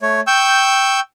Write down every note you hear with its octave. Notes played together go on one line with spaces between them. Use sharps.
A3 C#5
G5 C#6 E6 G6